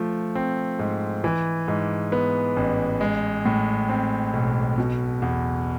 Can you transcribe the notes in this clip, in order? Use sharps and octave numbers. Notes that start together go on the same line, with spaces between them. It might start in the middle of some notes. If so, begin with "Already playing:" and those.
Already playing: F3 A3
C4
G#2
E3
G#2
B3
A1
G#3
A2
C4
B1
B2
E2